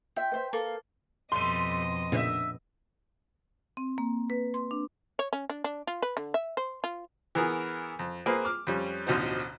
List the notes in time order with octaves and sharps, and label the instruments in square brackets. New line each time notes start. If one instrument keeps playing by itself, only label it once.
[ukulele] F4 E5 [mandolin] G5
[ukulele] B4 C5 E5
[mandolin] A#3 [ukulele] A4 B4
[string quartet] F2 B2 D#5 [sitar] G3 A3 [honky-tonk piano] C6 D#7
[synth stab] A#2 C#3 B3 [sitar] D4 C5 E5
[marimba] C4
A#3
B4
C6
D4
[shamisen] C#5
C#4
D4
D4
F4
B4
D3
E5
C5
F4
[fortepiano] E3 B3 G#4 A#4
F2
A#3 C4 G#4 B4
D6 F6
F2 G3 C#4
A1 D2 B2 F3 D#4 C5